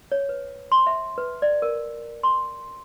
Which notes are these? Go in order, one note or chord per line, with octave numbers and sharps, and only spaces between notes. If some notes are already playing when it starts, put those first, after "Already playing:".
C#5
B4
C6
E5
B4
D5
A#4
C6